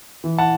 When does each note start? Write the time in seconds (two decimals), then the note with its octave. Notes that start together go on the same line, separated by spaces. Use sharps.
0.24 E3
0.38 F#5 A5